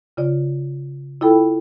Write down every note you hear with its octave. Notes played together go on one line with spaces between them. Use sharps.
C#3 F4 D5
E4 F4 A4 G5 B5